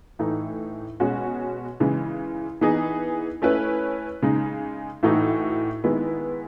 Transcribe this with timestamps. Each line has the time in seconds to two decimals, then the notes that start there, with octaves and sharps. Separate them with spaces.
0.19 A2 E3 A3 D#4
1.00 B2 G#3 C#4 F#4
1.80 C#3 E3 G#3
2.61 E3 B3 D#4 G#4
3.42 A3 C#4 E4 B4
4.22 C#3 G#3 D#4
5.03 A2 E3 A3 D#4 F#4
5.84 D#3 G#3 B3 E4